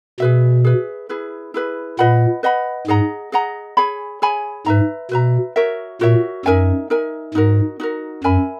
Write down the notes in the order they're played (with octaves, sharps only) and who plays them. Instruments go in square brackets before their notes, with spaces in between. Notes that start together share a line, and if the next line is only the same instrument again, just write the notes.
[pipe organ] B2 [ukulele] G#4 B4 E5
[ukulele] G#4 B4 E5
E4 G#4 B4
E4 G#4 B4
[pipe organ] A#2 [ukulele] B4 D#5 F#5 B5
[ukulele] B4 D#5 F#5 B5
[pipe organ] G#2 [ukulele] G#4 D#5 F#5 A#5
[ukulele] G#4 D#5 F#5 A#5
G#4 C#5 G#5 B5
G#4 C#5 G#5 B5
[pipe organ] G#2 [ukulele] B4 E5 A#5
[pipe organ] B2 [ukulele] B4 E5 A#5
[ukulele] F#4 A#4 C#5 E5
[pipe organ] A#2 [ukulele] F#4 A#4 C#5 E5
[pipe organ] F#2 [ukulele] D#4 A#4 E5 G#5
[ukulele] D#4 A#4 E5 G#5
[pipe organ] G#2 [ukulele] D#4 F#4 A#4
[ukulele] D#4 F#4 A#4
[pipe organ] F#2 [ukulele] A#4 E5 G#5 B5